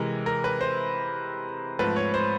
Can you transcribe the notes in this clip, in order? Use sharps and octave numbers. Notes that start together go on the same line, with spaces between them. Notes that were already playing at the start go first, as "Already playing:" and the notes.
Already playing: C3 E3 G#3 A#4
A#4
B4
C5
G#2 F3 A3 C4 B4
C#5
C5